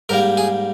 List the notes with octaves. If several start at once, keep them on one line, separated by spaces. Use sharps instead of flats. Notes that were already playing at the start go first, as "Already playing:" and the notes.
G#2 G3 A#3 A#4
G#4